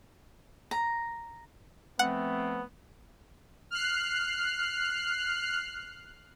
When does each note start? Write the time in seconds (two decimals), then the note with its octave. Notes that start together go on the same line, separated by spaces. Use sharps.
0.71 A#5
1.99 F3 A3 B3 C4 F#5
3.71 F6 F#6 C7